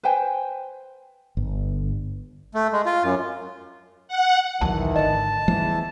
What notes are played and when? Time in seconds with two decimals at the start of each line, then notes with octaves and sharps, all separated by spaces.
0.03 B4 C5 G5 G#5
1.37 G1
2.54 A3
2.72 G#3
2.86 F4
3.03 F#2
4.08 F#5
4.61 A#1 D#2 D#3 E3 F#3 A5
4.96 G#1 D3 D#5 A5
5.48 E2 E3 F3 G3 A3